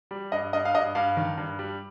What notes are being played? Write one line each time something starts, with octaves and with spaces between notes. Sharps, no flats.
G3
G2 D#5
G2 D#5
F5
G2 D#5
G2 F5
D#3
G2
G3